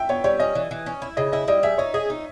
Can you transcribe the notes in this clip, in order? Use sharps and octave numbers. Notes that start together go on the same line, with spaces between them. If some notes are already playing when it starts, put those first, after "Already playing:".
Already playing: E5 G5
B3 C#5
G3 C#5
C#4 D#5
E3
E3
C#4
E4
C#3 D#5
E4 D#5
G3 D#5
G#4 E5
D#4 C#5
G#4 D#5
D#4